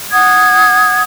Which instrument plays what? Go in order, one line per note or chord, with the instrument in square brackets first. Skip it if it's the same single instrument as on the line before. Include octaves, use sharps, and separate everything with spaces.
[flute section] F#5 D#6 G#6